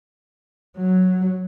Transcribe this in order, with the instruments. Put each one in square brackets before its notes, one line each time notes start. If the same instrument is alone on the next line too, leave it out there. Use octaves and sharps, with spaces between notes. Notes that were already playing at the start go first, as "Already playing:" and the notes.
[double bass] F#3